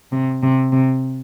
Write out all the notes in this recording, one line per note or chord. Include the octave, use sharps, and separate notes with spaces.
C3
C3
C3